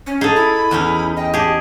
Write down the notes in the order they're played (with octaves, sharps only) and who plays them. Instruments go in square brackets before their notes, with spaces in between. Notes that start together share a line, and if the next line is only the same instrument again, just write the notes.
[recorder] C#4
[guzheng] D#4 [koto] G#4 A4
[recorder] E4 [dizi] B5
[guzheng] E2 C#4 D#4 [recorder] E4
[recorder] D#5 [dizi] G5
[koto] G4 G#4 [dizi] A5